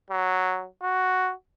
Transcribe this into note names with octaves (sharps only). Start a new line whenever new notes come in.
F#3
F#4